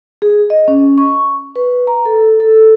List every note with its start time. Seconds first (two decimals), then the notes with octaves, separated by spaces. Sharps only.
0.22 G#4
0.50 D#5
0.68 C#4
0.98 C#6
1.56 B4
1.87 A#5
2.05 A4
2.40 A4